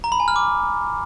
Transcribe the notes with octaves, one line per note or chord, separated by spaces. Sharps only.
A#5
B5
G#5
F6
D6